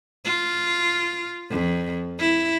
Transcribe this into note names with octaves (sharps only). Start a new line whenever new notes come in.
F4
F2
E4